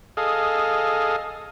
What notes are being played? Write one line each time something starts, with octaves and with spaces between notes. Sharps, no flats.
G#4 A4 D#5 F5